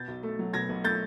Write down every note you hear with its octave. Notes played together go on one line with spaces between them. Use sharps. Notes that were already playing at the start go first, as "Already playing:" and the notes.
Already playing: B2 G6 A6
B1
A3
F#3
B2 G#6 A#6
B1
A3 G6 A6